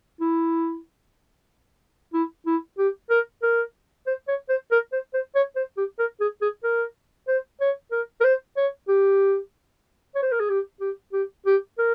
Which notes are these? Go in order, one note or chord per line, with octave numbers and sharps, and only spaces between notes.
E4
E4
E4
G4
A#4
A#4
C5
C#5
C5
A#4
C5
C5
C#5
C5
G4
A#4
G#4
G#4
A#4
C5
C#5
A#4
A#4
C5
C#5
G4
C#5
C5
A#4
G#4
G4
G4
G4
G4
A#4